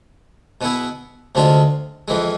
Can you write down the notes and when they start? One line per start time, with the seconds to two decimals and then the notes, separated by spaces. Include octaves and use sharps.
0.61 B2 B3 E4 G#4
1.35 D2 C3 G#3 D4 F4
2.08 F2 E3 G#3